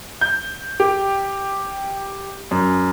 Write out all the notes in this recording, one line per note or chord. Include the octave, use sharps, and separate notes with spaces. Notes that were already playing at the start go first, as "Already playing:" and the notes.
G6
G4
F#2